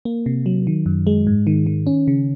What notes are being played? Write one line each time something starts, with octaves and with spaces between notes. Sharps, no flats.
A#3
C3
F#3
D#3
F#2
G#3
G#2
D#3
D#3
C#4
C#3